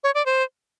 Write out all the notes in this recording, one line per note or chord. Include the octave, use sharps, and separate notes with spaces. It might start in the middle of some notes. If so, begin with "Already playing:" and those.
C#5
D5
C5